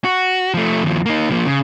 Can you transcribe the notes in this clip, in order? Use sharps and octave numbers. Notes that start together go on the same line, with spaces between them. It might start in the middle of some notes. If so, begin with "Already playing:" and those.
F#4
F3 A3
D#2 F3
A#3 D#4
F3 A#3
C#3